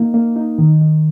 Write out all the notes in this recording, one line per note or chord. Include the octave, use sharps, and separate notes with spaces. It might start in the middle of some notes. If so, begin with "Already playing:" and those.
Already playing: A#3 D#4
A#3
D#4
D#3
D#3